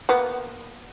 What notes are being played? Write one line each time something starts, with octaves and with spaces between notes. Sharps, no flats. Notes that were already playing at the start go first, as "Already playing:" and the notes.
A#3 B3